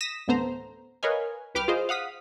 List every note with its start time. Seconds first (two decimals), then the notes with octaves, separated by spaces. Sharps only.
0.01 D#6 A#6 B6 E7
0.28 A1 D2 B3 A4 C5 A#5
1.03 A#4 B4 C#5 D#5 F5 G#5
1.55 C2 B4 G5 D6 F6
1.68 F4 G#4 C5 D#5 F5
1.89 F5 F#5 D#6 B6